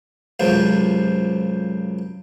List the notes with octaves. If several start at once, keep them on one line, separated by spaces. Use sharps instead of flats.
C#2 F#2 C3 F3